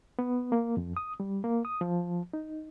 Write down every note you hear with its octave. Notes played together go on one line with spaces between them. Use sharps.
B3
A#3
F2
D#6
G3
A#3
D#6
F3
D#4